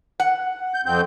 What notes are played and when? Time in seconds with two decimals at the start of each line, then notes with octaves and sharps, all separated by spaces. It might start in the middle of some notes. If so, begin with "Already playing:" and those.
0.20 F#5
0.74 G6
0.86 F2 C4 G6